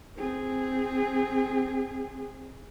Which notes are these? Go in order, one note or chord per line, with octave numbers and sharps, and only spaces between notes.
C4 G#4